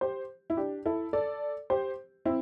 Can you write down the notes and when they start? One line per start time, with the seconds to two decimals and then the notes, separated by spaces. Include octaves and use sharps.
0.01 G4 C5
0.50 E4
0.57 D4 G4
0.85 E4 A4
1.13 A4 D5
1.70 G4 C5
2.25 C4 E4